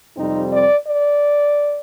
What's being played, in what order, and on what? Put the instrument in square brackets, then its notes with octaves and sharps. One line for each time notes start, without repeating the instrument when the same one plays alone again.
[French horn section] F2 C3 G3 C4 D#4
D5
D5